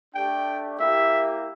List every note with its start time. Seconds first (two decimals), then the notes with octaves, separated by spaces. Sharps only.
0.14 A3 D4 G4 G5
0.79 A#3 E4 G4 E5